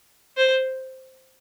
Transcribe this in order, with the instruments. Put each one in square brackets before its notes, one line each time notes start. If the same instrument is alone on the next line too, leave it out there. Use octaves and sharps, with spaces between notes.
[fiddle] C5